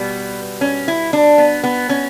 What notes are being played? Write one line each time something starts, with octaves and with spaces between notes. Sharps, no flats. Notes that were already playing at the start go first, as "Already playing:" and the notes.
Already playing: B2 G3 B3
C#4
E4
D4
B3
B3
C#4